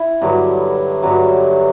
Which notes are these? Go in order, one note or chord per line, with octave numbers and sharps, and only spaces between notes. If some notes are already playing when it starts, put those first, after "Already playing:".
Already playing: E4
G2 D3 F#3
G2 D3 F#3